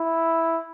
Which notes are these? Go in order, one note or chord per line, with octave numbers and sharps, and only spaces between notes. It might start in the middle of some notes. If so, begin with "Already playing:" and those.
Already playing: E4